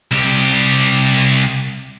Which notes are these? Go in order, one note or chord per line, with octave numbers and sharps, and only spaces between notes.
C2 G4